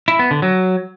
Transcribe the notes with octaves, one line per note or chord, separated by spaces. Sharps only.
E4
B3
D3
F#3